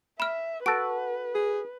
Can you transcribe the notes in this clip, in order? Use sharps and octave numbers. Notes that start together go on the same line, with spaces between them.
E5 B5 F6
F#4 A4 B4 A5 D7
G#4